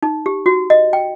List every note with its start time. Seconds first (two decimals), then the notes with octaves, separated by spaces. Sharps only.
0.03 D#4
0.26 G4
0.46 F#4
0.70 D#5
0.93 G5